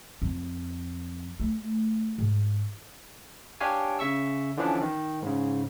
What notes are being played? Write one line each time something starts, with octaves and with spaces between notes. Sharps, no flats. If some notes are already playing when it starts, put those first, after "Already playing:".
F2
A3
G#2
D4 G4 C#5 F5 G#5
C#3 E5 C#6 E6
D3 E3 F3 C#4 D4
D#3
G#2 C#3